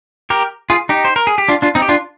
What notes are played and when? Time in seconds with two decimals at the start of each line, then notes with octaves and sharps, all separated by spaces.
0.30 G4 A#4
0.70 F4 G#4
0.89 D#4 G4
1.05 C5
1.16 A#4
1.27 G#4
1.38 G4
1.48 D4 F4
1.62 D4 F4
1.75 C4 D#4
1.82 G4
1.89 D4 F4